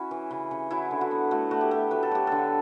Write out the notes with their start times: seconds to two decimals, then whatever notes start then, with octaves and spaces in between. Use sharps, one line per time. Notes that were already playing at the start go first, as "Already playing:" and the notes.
Already playing: C#4 E4 F#4
0.11 E3
0.31 C#3
0.51 C#3
0.71 F#3 E4
0.91 D3
1.01 F#4
1.11 B3
1.31 A3 F#4
1.51 A3 F#4
1.61 G4
1.71 A3
1.91 F#3 B4
2.03 A4
2.11 F#3 G4
2.27 D3 A4